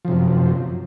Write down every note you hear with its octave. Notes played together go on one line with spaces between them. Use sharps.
F#2 C3 F3